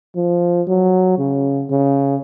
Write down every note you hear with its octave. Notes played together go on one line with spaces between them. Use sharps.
F3
F#3
C#3
C#3